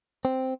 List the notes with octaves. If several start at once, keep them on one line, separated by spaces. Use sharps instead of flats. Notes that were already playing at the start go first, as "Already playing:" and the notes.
C4